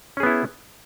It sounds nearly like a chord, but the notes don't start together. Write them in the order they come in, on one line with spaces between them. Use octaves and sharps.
C#4 G#4 B3 E4